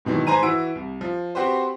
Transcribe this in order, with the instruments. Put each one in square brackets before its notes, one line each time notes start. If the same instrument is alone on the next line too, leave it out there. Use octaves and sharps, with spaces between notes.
[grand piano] G#2 B2 D#3 E3 F#3
G#2 B4 C5 G#5 A#5 D#7
E3 E4 F#4 E6 D7
C2
F3
C4 F#4 G4 B4 C5